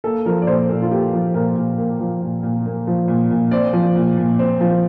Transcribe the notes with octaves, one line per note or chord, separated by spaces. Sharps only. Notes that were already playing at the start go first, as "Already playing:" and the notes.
A#3 A4
F3 A#4
D5
A#2 C5
A#2 A4
F4
A#3 G4
F3
A#2 A#4
A#2
A#3
F3
A#2
A#2
A#3
F3
A#2
A#2
C4 D5
F3
A#2
A#2
C4
F3